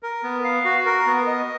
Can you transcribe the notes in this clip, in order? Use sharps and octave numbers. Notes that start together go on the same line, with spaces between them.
A#4
B3
F5
F#4
A#4
B3
D#5